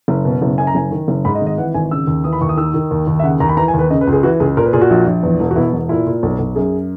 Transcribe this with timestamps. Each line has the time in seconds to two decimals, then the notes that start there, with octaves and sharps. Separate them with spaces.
0.08 F#1
0.25 B2
0.42 F#1
0.58 F#2 G#5
0.67 A#5
0.75 F#1 G#5
0.91 D#3
1.08 F#1
1.25 G#2 B5
1.35 D#5
1.41 G#1
1.46 D#5
1.58 E3 F#5
1.74 G#1 G#5
1.91 C#3 E6
2.07 D#2
2.24 E3 D#6
2.33 B5
2.41 D#2 C#6
2.49 D#6
2.57 D#3 E6
2.74 D#3
2.91 D#2
3.07 D#2
3.19 E5
3.24 C#3 F#5
3.40 D#2 A#5
3.49 B5
3.57 E3 A#5
3.68 G#5
3.74 D#2 B4
3.90 C#3 D#5
4.01 B4
4.07 C#2
4.13 G#4
4.23 E3 F#4
4.40 C#2 G#4
4.57 A#2 A#4
4.65 B4
4.73 A#2 G#4
4.81 F#4
4.90 A#1
5.06 A#1
5.23 E2
5.40 E1
5.51 F#4
5.56 B2 E4
5.73 E1
5.89 A#2 E4
6.06 A#2
6.23 B1
6.39 B1
6.56 F#2 G#4